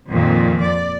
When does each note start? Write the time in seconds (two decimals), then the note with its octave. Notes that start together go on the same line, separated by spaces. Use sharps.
0.11 F2 A#2 D#3
0.63 D5